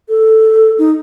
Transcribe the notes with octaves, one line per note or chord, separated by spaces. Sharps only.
A4
D#4